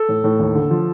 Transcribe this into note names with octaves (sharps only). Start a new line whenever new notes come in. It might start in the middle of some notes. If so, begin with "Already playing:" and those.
Already playing: A4
A2
A2
D#2
D3
F3